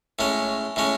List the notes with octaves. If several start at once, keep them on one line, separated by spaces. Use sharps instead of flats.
A2 G#3 C#4
A2 G#3 C#4